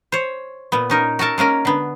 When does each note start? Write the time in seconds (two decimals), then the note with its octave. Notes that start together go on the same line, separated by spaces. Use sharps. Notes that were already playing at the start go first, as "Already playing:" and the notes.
0.12 C5 C#5
0.72 A#2 B3
0.90 C#4 D#4 A#4
1.19 F#4 A4 A#4 A5
1.38 G#3 A#3 C#4 A#4
1.65 D3 B3